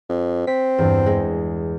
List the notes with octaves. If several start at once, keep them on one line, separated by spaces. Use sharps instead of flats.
F2
C4 B6
E2 G2
G#3